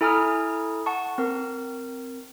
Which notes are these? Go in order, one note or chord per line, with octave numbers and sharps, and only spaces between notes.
E4 A4 G#5 A#5 D#6 F6
F#5 A5 C#6
C4 A#4